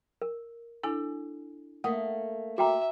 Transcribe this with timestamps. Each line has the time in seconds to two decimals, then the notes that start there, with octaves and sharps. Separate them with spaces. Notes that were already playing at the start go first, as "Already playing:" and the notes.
0.22 A#4
0.83 D4 E4 A4 G#5
1.84 A3 A#3 F#5 D#6
2.58 F#4 E5 G5 A#5 D6